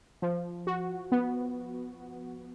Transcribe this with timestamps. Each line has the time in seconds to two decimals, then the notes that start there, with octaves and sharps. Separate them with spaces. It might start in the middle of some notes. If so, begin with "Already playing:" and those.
0.22 F3
0.67 F#4
1.12 B3